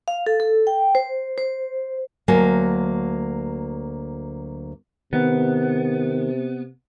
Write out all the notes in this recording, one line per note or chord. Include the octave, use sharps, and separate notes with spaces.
F5
A4
A4
G5
C5
C5
D2 F#3 A#3 G#5
C3 D#3 B3